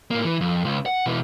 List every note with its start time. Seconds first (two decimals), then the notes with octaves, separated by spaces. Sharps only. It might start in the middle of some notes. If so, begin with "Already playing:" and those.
0.11 A2 A#3
0.25 E3
0.41 F2
0.65 C#2
0.86 F#5
1.06 B2 E3